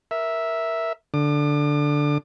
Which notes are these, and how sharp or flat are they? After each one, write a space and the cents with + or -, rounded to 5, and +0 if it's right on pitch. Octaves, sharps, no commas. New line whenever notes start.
A#4 +0 E5 -5
D3 -5 D6 +35